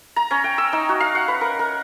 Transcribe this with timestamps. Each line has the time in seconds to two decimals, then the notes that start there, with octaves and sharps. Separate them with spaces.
0.16 A#5
0.31 C#4
0.44 G5
0.58 E6
0.73 D#4
0.89 F#4
1.00 F5
1.15 F#5
1.28 B4
1.41 A#4
1.59 A#4